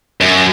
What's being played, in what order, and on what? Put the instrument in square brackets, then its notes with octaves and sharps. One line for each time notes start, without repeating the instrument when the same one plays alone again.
[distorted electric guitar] F#2